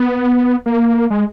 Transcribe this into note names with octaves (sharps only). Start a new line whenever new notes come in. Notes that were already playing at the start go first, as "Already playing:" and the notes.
Already playing: B3
A#3
G#3